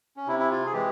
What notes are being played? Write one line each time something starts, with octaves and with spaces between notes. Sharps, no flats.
C#4
C3 E4
E4
F4
G#4
E3 G#3 G4